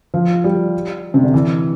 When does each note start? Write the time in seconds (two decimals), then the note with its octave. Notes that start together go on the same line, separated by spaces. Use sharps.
0.14 F3
0.44 G3
1.14 C3
1.23 D3
1.34 E3